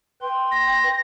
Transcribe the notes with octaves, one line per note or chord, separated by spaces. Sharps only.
B4 G5 C6
A#6